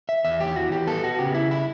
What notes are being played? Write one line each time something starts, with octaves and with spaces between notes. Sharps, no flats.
E5
E2 E5
G4
E3 F#4
G4
B3 A4
F#4
C#3 G4
E4
E4